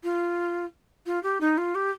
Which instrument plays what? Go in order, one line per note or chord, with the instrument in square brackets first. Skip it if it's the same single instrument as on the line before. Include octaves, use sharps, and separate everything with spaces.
[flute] F4
F4
G4
D#4
F4
G4